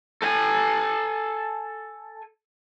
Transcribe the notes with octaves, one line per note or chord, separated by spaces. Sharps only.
A4 G#5